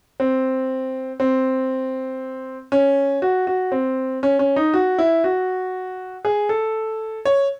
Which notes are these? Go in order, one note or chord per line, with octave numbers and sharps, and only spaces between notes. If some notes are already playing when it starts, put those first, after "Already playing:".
C4
C4
C#4
F#4
F#4
C4
C#4
C#4
D#4
F#4
E4
F#4
G#4
A4
C#5